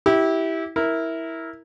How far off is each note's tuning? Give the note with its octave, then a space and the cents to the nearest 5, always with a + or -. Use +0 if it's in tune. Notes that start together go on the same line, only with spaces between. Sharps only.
E4 -15 G4 -15
E4 -10 A#4 +0